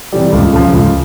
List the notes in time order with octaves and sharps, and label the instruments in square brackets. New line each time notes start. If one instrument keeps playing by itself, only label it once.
[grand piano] C3 E3 G3
C#2
C#3 F3
C#2